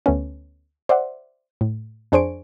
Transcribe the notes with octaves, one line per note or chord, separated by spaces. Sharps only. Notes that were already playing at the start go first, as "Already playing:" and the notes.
D2 A3 B3 C#4
C5 D5 E5 F#5
A2
F2 D4 G#4 C5 C#6 D7